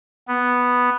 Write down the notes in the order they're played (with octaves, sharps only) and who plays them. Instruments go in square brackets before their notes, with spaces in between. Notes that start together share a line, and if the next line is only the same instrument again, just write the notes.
[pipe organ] B3